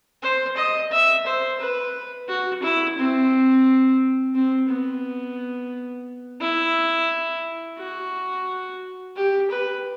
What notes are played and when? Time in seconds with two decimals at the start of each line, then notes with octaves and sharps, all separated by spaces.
0.23 C5
0.56 D#5
0.91 E5
1.26 C5
1.60 B4
2.29 F#4
2.63 E4
2.98 C4
4.35 C4
4.70 B3
6.41 E4
7.79 F#4
9.16 G4
9.51 B4